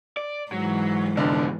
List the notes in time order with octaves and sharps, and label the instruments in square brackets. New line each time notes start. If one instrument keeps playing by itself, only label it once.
[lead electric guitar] D5
[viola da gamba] G#2 E3 [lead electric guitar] F#3
[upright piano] F1 D3 [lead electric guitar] B2 F3